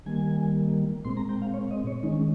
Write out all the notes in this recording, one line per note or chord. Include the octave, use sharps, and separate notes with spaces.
D#3 G3 A#3 G#5
A#2 G#3 C4 C6
A#5
G5
F5
C#5
D#5
C#5
D#3 G#3 C#4 D#4